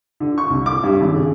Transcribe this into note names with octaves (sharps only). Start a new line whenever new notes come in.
D3
C#6
C2
D6
G2
G#1
C#3